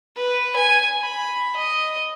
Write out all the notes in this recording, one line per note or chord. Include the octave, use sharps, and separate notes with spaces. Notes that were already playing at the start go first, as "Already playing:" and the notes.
B4
G#5
B5
D#5